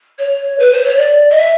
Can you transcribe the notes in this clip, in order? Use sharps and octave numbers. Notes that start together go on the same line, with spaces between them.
C#5
B4
C5
C#5
D5
D#5
E5